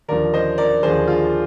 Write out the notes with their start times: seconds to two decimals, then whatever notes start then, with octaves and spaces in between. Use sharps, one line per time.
0.08 D#2 D3 F3 A#4 D5
0.34 C5 D#5
0.58 A#4 D5
0.83 D#2 D3 F3 G#4 C5
1.08 F4 G#4